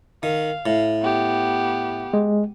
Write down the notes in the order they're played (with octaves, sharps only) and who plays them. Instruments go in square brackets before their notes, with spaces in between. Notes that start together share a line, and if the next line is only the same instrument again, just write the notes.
[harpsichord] D#3 [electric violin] F5
[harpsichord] A2
[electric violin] B3 G4
[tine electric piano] G#3